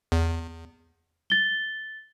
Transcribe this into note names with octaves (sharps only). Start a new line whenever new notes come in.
E2
A6 G7